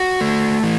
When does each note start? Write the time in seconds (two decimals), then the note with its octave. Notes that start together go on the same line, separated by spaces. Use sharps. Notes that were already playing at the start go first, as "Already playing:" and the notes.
Already playing: F#4
0.21 A3
0.63 E3